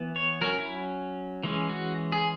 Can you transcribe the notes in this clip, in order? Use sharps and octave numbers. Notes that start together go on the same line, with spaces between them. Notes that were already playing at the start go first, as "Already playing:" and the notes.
Already playing: E3 B3
C#5
F#3 C#4 A#4
E4
E3 G#3 C#4
F#4
G#4